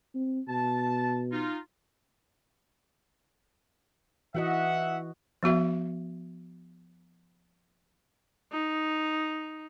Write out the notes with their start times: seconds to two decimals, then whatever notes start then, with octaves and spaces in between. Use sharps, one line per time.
0.15 C4
0.49 B2 A5
1.32 D#4 F4
4.35 E3 F#4 D#5 E5 F#5
5.43 F3 B3 F#4 E5
8.52 D#4